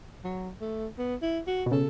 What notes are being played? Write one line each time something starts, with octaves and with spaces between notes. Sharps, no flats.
F#3
A3
B3
E4
F#4
B2
C#3 A4